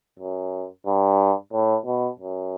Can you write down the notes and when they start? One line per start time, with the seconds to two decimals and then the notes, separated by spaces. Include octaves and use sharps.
0.19 F#2
0.86 G2
1.53 A2
1.86 B2
2.19 F#2